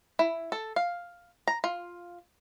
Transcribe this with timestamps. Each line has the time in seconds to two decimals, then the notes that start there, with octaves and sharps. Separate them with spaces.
0.19 E4
0.52 A4
0.76 F5
1.48 A#5
1.64 F4